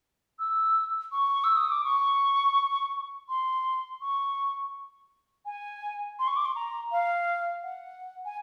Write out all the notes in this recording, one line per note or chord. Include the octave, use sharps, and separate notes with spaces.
E6
C#6
E6
D#6
D6
C#6
C6
C#6
G#5
C6
C#6
D6
C6
A#5
F5
F#5
G#5